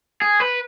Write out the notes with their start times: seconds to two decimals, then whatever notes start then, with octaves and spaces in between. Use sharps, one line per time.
0.22 G#4
0.40 B4